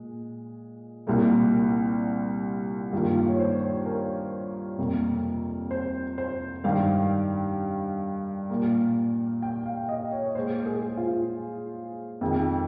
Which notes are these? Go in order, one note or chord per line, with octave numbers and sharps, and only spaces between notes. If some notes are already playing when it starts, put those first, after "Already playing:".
Already playing: A#2 G#3
C2 A#2 G3 A#3
G2 D#3 A#3 F4
F4
C#5
C5
C5
A#4
F2 C3 G3 A#3
C5
C5
G2 D#3 G3 F5
A#2 G3 A#3
G5
F5
D#5
C#5
A#2 G#3 C5
G#4
F4
F2 D#3 G#3